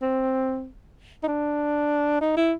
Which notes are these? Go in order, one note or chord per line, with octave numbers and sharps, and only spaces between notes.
C4
D#4
D4
D#4
E4